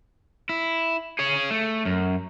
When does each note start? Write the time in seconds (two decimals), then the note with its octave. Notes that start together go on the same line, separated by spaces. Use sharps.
0.49 E4
1.19 G#4 C#5
1.50 A3
1.85 F#2